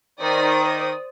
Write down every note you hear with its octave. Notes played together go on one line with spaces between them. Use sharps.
D#3 C5 D5 D#6